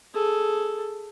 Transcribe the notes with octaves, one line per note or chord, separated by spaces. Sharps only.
G#4 A4